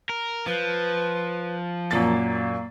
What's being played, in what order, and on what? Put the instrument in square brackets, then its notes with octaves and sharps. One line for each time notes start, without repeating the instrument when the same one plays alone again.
[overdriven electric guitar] A#4
[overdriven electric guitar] F3 [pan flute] B4
[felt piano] F#2 A#2 A6 [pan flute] A#3